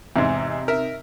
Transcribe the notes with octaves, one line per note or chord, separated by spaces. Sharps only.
E2 G#2 C3 D#4
A#4 E5